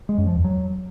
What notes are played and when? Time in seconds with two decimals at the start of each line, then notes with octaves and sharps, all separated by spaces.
0.09 G#3
0.18 F#2
0.27 F3
0.36 E2
0.44 F#3